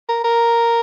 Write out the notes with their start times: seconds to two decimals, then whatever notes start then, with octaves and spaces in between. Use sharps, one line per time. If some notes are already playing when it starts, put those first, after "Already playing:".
0.09 A#4
0.24 A#4